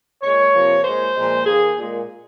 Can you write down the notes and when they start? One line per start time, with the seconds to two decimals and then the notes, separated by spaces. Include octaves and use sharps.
0.23 A#2 G#3 C#5
0.53 C3 F3 A#3
0.84 A#2 G#3 C5
1.15 A#2 F3 G#3
1.46 D#3 A#3 G#4
1.76 A#2 G#3